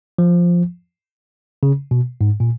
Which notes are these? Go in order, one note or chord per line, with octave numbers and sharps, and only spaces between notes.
F3
C#3
B2
G#2
A#2